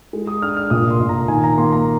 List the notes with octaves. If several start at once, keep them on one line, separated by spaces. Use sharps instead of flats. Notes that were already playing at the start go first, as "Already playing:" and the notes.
G#3
D#6
D4 F6
F6
A#2 D#6
C6
A#2
A#5
D#3 G#5
A#5
A#3 C6
A#5